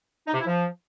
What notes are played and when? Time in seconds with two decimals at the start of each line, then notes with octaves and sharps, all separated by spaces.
0.27 D#4
0.34 C3
0.40 E4
0.47 F3